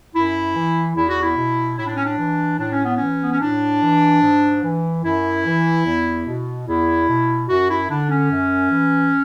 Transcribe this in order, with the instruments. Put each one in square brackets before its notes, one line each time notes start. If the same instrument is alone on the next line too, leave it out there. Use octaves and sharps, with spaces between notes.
[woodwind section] F#2 E4
E3
E2 E4
F#4
E4
B2
A2 E4
D4
C#4
D4
E3
A2 D4
C#4
B3
E3 C#4
B3
C#4
A2 D4
E3
G#2
E3
F#2 E4
E3
E2
B2
E2 E4
B2
F#2 F#4
E4
D3 D4
C#4
F#2
E3